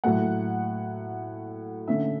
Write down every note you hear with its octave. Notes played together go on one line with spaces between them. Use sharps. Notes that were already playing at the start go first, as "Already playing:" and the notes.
A2 F#3 A3 F#5
D3 A3 C#4 E5